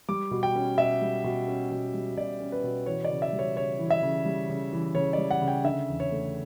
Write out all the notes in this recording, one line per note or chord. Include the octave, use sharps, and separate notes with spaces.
G3 D6
B2
G5
C#4
B2 E5
G3
B2
C#4
B2
G3
B2 D5
C#4
B4
B2
E3 C#5
D5
C#3
E5
G3
C#5
C#3 C#5
E3
E5
C#3
G3
C#3
E3
C#3 C#5
G3 D5
F#5
C#3
G5
D3 E5
E2
C#5
A3